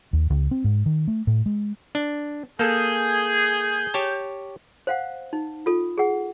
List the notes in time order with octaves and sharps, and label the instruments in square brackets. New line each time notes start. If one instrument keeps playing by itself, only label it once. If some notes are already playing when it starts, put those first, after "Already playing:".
[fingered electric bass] D#2
C#2
C4
G#2
D#3
A3
A2
G#3
[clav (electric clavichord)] D4
[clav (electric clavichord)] A#3 A4 [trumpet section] G#4 [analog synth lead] G6
[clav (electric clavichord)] G4 C#5 A5
[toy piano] C5 F5 F#5
D#4
F4 A4
G#4 F#5